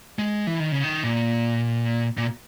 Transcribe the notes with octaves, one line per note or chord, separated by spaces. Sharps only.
G#3
E3
D#3
C#3
D#3
A#2
A#2